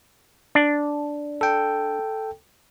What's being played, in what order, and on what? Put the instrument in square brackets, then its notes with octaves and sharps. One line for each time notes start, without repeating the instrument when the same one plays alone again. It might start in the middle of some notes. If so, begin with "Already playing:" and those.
[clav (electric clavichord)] D4
[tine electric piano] A4 G5